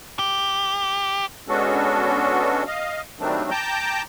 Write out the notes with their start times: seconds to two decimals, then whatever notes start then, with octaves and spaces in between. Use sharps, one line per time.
0.19 G4
1.49 G#3 B3 C#4 D4 F#4 A4
2.67 D#5 F5
3.20 D#3 F#3 G3 A3 C4 D4
3.51 G5 A5 A#5 D6 G6